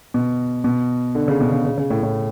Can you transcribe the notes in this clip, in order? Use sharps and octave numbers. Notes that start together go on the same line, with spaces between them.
B2
B2
D3
C#3
B2
C#3
C#3
C#3
A2
A2